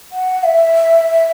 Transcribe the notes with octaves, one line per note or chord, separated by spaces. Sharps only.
F#5
E5